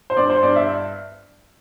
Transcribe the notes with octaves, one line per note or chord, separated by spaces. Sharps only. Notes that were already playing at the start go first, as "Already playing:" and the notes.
C5
G2 D5
C5
G2 D5
E5